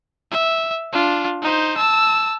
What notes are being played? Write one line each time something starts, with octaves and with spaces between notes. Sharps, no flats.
E5
D4 F4
D#4 C5
A5 E6